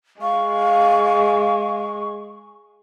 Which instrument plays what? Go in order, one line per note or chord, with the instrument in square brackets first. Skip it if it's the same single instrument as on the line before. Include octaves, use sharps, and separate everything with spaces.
[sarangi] G#3 [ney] F5 [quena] C#6